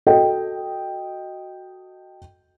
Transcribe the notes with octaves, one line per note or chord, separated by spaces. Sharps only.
F#4 A4 D#5 G5